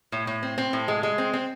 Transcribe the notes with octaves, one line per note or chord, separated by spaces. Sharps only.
A2
A2
C4
C4
A2
G#3
G#3
C4
C4